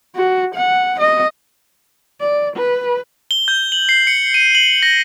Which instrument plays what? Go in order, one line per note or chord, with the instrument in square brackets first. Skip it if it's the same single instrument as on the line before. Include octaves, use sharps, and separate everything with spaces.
[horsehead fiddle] F#4
F#5
D#5
D5
B4
[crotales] G7
G6
F#7
C7
C#7
D#7
F#7
A#6